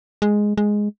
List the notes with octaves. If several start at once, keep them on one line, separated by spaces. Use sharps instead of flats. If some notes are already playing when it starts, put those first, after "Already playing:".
G#3
G#3